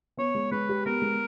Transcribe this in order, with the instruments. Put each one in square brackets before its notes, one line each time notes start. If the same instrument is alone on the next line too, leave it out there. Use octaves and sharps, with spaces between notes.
[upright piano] B3 [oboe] C#5
[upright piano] G#3
[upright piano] G#3 [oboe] B4
[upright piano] G4
[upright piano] B3 [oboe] A#4
[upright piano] G#3